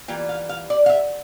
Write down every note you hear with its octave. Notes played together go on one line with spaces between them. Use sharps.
E3 G3 A#3 F4 G5
F5
F5
D5
F5
E5